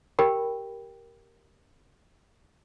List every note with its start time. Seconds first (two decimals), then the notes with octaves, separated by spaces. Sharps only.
0.19 G4 A#4 G5 B5